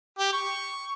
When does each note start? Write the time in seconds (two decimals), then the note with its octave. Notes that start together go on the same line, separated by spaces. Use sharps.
0.19 G4
0.33 C#6